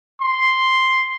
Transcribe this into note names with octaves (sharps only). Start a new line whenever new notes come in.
C6